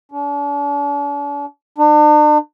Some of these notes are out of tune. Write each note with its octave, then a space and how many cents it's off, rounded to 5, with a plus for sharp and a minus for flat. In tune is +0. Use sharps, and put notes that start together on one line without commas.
D4 -45
D4 +40